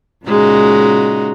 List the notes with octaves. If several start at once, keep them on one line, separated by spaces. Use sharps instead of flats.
A#2 C#3 G#3 D#4 F#4